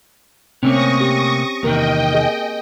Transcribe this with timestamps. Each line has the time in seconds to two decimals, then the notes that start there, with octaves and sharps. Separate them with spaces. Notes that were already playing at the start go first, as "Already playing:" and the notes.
0.63 C3 A3 A#3 C4 C#4 C#6 D#6 A#6
1.01 G4
1.63 E2 C3 D#3 A#3 A#4 D#5 G5
2.14 G#4